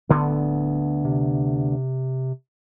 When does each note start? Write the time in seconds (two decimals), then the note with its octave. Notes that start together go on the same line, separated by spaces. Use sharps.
0.09 D1 D2 D3 B3
1.05 C3